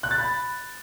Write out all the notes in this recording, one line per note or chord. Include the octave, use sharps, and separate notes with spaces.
F#6
A6
B5